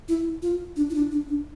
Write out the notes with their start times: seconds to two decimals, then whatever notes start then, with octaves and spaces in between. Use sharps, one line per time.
0.08 E4
0.42 F4
0.76 D4
0.90 E4
0.95 D4
1.11 D4
1.28 D4